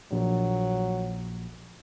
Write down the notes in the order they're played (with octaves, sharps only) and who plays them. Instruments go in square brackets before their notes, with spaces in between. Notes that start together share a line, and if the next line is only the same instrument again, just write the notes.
[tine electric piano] A#1 [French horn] F#3